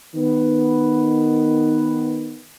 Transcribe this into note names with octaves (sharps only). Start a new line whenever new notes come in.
D#3 B3